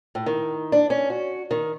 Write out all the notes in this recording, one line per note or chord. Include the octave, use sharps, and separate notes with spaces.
A2
D#3
D4
C#4
F#4
D#3